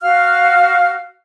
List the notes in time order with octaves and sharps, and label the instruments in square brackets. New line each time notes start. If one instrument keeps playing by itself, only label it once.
[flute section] F#4 F5 F6